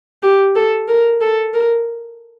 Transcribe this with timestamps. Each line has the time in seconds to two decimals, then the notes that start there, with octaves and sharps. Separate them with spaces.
0.23 G4
0.55 A4
0.88 A#4
1.21 A4
1.53 A#4